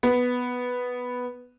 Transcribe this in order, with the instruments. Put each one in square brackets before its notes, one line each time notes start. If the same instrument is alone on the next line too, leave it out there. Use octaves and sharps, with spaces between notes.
[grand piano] B3